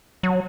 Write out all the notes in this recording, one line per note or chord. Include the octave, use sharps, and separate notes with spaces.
F#3